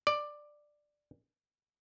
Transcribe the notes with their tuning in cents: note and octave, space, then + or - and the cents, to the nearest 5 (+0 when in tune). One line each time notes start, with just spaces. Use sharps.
D5 +10